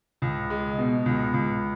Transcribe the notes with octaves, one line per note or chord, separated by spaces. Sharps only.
C#2
G#3
B2
C#2
C#2